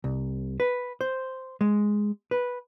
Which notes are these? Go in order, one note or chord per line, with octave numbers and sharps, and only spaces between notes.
C2
B4
C5
G#3
B4